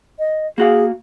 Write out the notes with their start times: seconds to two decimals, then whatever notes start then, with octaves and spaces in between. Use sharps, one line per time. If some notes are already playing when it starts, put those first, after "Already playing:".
0.19 D#5
0.58 A#3 F#4 G#4 F5